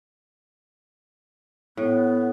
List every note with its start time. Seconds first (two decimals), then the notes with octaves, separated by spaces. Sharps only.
1.77 A2 B3